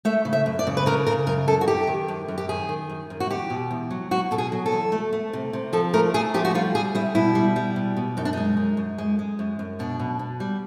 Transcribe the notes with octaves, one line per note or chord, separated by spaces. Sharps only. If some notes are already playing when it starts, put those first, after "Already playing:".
A3 E5
C#3
E5
F#2
D5
C#3
B4
C#3 A#4
C#3 A#4
F#2 A#4
F#2 A4
F#4
F#2 G4
D#3
F#2
F#2
G4
D#3 G#4
D#3
F#2
F#2
F#4
E2 G4
B2
E2
F#3
F#3 F#4
B2 A4
G#4
F#3
A4
E2
A3
A3
C3
C3
F3 A4
A3 A#4
A3 G#4
F3 G4
F#4
G3 F4
G3 G#4
G3 E4
B2 E4
G3
G3
B2
B2
F#2 D#4
D4
G#3 D#4
F#2
F#2
G#3
G#3
F#2
F#2
B2 D4
B2
B2
G3